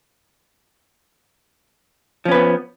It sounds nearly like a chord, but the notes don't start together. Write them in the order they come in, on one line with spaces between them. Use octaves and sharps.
F3 C#4 B4 B3